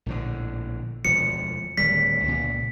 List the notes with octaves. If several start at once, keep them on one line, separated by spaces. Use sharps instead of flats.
A#1 A2 D3
E1 D2 F3 C#7
D1 D#3 G3 B6
C#2 A#2